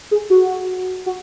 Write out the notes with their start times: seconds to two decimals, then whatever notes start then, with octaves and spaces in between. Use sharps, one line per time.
0.11 G#4
0.30 F#4
1.06 F#4